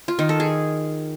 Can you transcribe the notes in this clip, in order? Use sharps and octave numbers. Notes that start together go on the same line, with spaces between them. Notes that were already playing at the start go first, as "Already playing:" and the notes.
F4
D#3
A4
G#4